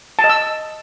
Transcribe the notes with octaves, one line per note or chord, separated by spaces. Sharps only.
A5
D#5
E6